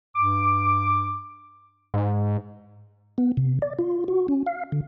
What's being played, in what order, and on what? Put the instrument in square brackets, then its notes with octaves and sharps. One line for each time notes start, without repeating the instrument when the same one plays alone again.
[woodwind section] G2 D6
[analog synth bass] G#2
[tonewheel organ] B3
C3
D5
F4
F#4
C#4
F5
D3